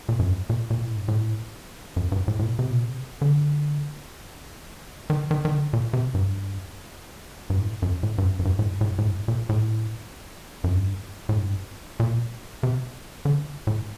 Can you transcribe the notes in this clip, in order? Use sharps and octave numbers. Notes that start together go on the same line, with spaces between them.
A#2
F#2
G2
A#2
A#2
A2
G2
A2
F#2
G2
A2
A2
A#2
C3
A#2
C3
D3
D#3
D#3
D#3
D3
A#2
C3
G2
G2
A2
F#2
A2
G2
F#2
F#2
G2
A2
G2
A2
G2
A2
G2
A#2
A2
F#2
G2
A2
G2
A#2
C3
D3
A2